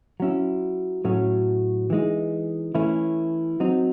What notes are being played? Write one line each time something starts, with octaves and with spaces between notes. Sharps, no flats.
F#3 C#4 E4
A2 F#3 A3 C#4
E3 G#3 D#4
E3 A3 C#4 E4
F#3 C4 D#4